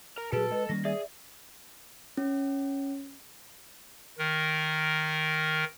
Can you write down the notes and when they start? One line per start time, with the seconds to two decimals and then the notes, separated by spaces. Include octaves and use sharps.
0.18 A#4
0.32 A#2 F#3 F#4 G#4 A4 B4 A5 D7
0.52 G#3 B4 D#5
0.69 D#3 G3 A#3 C#4 A#6
0.85 G#4 D5 E5
2.17 C#4
4.18 D#3 A#4